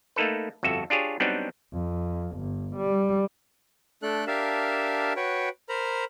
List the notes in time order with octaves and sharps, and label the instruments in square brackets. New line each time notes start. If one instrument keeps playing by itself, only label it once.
[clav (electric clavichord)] A3 A#3 D#4 A4 B4
G1 F2 F#4 A4 E5
D4 F4 G4 G#4 C#5
F#3 G3 B3 C4 D4 D#4
[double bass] F2
G1
G3
[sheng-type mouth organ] A3 D4 A4 F#6
D4 G4 A#4 E5 F5 A5
F#4 B4 C#5 G5
A#4 C5 A#5 B5